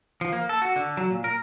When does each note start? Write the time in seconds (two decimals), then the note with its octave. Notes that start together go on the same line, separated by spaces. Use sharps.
0.21 F3
0.32 A#3
0.49 A4
0.62 F#4
0.76 D3
0.97 F#3
1.10 A#2
1.24 A#4